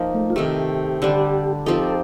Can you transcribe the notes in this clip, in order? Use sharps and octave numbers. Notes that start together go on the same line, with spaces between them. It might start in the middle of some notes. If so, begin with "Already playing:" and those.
Already playing: F3 A#3 D#4
A3
F4
C3 D#3 A3 G4
D3 G3 D4
F3 C4 D#4 G4 A4